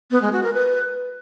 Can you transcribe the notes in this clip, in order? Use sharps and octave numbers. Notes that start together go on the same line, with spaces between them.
B3
G#3
F#4
A#4
B4